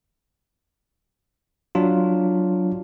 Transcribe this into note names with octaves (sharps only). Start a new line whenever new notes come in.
F#3 D4 F4